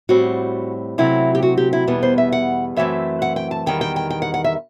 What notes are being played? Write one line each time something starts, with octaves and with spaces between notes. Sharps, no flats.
A2 G3 C4 F#4
C3 F#3 A3 C4 E4
G4
F#4
G4
E4
E2 B2 G3 B3
C5
E5
F#5
F#2 E3 A3 C4 E5
F#5
G5
A5
E2 D#3 G3 G5
G5
G5
G5
F#5
F#5
E5